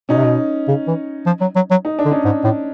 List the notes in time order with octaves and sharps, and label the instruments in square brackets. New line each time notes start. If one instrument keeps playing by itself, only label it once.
[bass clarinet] B2 [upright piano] C#4 D#4
[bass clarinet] C3
B2
C#3
E3
F3
F#3
F#3
F#3
[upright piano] D#4
D4
[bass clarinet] D3
[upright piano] C#4 D#4
[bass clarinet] G#2
A2